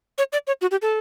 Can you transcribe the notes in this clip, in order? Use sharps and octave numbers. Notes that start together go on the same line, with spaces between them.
C#5
D5
C#5
F#4
G4
A4